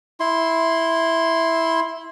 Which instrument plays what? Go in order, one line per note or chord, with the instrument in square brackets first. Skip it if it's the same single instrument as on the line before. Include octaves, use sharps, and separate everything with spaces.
[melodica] E4 C6